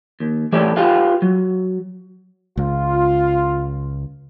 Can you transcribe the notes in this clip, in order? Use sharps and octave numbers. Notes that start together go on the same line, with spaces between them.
D#2
E3 A3 G4 C#5 D5
F4 G4 B4 F5
F#3
C#2 F4